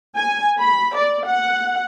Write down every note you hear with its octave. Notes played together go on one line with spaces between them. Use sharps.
G#5
B5
D5
F#5